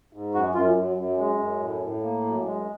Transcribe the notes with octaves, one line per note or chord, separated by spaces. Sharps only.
G#2
F#2 F#4
F#2 F4
F#2
F#2
G#3
F#2
A2
A2
A#3
F#2
G#3